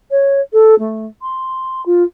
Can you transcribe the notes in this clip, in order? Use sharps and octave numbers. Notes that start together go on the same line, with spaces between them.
C#5
A4
A3
C6
F4